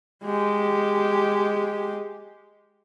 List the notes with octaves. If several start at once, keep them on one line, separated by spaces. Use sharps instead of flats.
G#3 G4